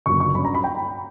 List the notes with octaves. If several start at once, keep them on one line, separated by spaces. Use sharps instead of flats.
F#1 F#2 D3 F#3 A#3 C#6
C#6
G2 F#3 C#4 B5
A#5
B5
G5